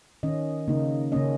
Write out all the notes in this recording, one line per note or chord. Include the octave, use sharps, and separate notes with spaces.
D#3 C#4 D#5
C#3 A#3 D#4
C#3 A#3 C#4 D#5